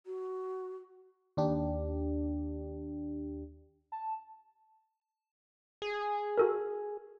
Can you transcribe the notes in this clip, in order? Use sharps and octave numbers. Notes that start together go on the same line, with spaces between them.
F#4
D#2 D4 G4
A5
G#4
F#4 A4 A#4